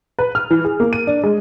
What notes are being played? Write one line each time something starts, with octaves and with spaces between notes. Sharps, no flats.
B4
F6
E3
G#4
A#3
D#7
D4
G#3